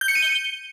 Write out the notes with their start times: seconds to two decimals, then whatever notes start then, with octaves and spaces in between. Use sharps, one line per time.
0.01 G6
0.08 C#7
0.15 D#7
0.22 G7